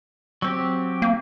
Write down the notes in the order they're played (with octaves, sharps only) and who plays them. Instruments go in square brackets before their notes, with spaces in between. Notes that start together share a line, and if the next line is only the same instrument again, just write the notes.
[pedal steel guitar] F#3 C4 G4
[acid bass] A#3